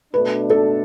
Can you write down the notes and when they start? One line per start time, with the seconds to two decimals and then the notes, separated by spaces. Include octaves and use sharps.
0.14 B2 A3 D4 B4
0.50 A4